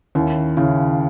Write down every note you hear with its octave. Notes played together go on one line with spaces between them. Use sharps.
D#2 C#4 E4
C#3 C#4 E4